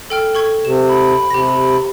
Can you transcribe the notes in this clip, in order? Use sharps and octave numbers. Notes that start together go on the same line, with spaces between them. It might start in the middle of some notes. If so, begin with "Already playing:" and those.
A4 G5 F6
A4 C#6 G#6
C3 E7
B5
C3 G4 A#6